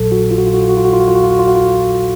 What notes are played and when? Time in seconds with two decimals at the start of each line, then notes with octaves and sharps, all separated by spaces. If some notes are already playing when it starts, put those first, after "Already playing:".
Already playing: A#1 A#2 F#3 A4
0.12 F#4
0.31 F4
0.38 F#4
0.46 F4
0.54 F#4
0.61 F4
0.69 F#4
0.77 F4
0.85 F#4
0.93 F4
1.00 F#4
1.08 F4
1.16 F#4
1.24 F4
1.31 F#4
1.39 F4
1.48 F#4
1.55 F4